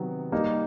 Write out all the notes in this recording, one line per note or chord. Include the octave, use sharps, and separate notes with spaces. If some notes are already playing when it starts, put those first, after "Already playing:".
Already playing: C3 D#3 F#3 B3
G3 A#3 D#4